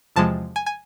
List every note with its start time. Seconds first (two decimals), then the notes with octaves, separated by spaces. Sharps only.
0.16 E2 C3 F3 G#3 A5
0.56 G#5
0.66 G#5